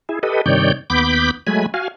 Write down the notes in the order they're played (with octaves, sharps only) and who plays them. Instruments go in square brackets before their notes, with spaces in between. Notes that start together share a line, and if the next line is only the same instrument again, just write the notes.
[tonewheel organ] E4 G#4
G4 A4 B4 D#5
G2 C3 D#3 C#5 D5 G6
D#2 B3 B5 D6 G6
F#3 G#3 A3 G#5 B5
F#4 F5 G#5